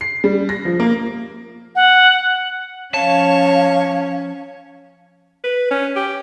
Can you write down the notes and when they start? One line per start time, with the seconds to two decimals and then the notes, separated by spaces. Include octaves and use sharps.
0.01 C7
0.24 G3
0.49 A#6
0.65 F3
0.80 A#3
1.75 F#5
2.94 F3 C#4 C#5 F5 A5
5.44 B4
5.71 C#4
5.96 G4